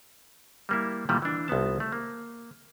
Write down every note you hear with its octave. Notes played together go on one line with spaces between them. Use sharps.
G3 A#3 E4
A#2 D#3 E3 G3 A3
E3 D4
C2 F3 B3 A5
A3
A#3